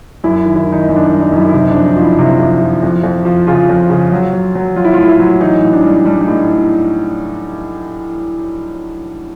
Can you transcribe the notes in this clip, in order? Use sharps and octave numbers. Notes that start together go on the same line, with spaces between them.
F#2 E4
D#3
E4
D#3
D#4
F#2 D#4
D4
G3 D#4
D#4
F#2
E4
E4
C3 D#4
F2 D4
D#4
F3
E4
C3
F2
F3
F2
F2
F3
C#3 F4
F2
C#3
F#3
F#3
F#3
F#3 F4
E4
A2 F4
E4
F#3
E3 D#4
A2
D4
G3
G3 D4
D#4
A2